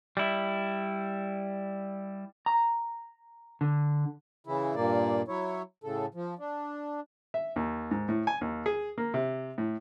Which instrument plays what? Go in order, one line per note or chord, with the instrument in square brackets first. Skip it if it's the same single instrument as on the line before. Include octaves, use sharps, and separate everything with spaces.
[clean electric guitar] G3 E4
A#5
D3
[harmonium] C#3 E3 E4
G2 A#2 A#3 D5
F#3 E4 C#5
A2 C#3 A4
F3
D4
[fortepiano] E5
D#2
G#2
A2
G#5
D#2
G#4
A#3
C3
A2